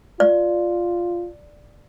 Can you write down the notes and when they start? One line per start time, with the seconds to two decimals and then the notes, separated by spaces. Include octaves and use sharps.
0.20 F4 D5